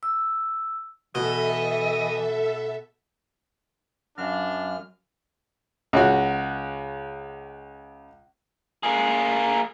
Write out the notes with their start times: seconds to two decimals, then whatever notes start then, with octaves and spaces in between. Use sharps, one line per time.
0.03 E6
1.15 B2 E3 A4 D#5 E5
4.18 F#2 F#3 D4 F5 F6
5.93 C#2 F#4
8.83 A#3 G#4